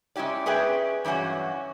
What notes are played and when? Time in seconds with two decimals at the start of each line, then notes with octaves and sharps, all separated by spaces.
0.16 G#3 C#4 E4 G4 D5
0.46 C#4 G#4 B4 D5 E5 G5
1.05 G2 E3 F#3 C#4 F#4